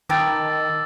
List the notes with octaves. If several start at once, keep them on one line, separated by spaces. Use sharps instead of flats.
D#3 G5 A5 B5 D6 E6 A6